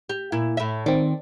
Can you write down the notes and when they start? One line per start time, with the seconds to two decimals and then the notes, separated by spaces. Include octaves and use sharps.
0.09 G4
0.32 A#2 E4
0.57 A2 E5
0.86 D#3 C4 D5